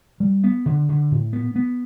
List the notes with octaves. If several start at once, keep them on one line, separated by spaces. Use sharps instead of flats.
G3
B3
D3
D3
A2
B3
B3